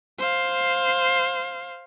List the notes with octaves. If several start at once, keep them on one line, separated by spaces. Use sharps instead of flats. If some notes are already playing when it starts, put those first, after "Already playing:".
C5 F5